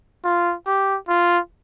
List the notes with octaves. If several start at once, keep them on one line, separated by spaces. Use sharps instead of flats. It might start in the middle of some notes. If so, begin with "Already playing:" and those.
F4
G4
F4